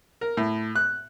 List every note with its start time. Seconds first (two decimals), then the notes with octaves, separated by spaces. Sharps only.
0.21 A#4
0.37 A2
0.76 F#6